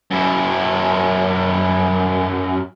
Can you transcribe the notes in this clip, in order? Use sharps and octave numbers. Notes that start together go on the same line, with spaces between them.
F#2 E4